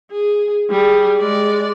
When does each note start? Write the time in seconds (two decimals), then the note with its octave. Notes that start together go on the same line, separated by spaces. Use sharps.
0.11 G#4
0.70 G3 G#4
1.18 G#3 D5